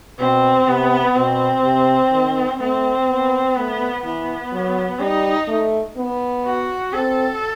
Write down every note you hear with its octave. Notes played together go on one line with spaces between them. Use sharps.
B2 C4
C3 B3
B2 C4
C3
D#3
A3 C4
B3
A3 B3
E3 B3
F#3
G3 D#4
A3
B3
F#4
C4 A4